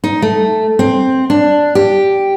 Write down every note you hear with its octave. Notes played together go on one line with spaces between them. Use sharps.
D#4
A3
C4
D4
G4